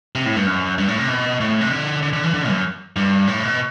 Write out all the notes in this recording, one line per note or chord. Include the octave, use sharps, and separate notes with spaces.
C3
A2
G2
F#2
G2
A2
C3
B2
A2
C3
D3
D3
D3
E3
D3
F#2
G2
A2
B2